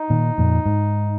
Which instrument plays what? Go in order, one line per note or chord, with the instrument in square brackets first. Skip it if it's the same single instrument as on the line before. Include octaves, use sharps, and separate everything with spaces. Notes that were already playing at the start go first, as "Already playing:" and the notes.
Already playing: [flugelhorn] D#4
[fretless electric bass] A#2 D#3
F2 A#2
G#2